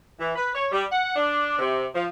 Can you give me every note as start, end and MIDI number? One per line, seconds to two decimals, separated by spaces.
0.20 0.32 52
0.36 0.51 71
0.55 0.66 73
0.72 0.84 55
0.92 1.15 78
1.15 1.56 62
1.59 1.86 48
1.95 2.06 53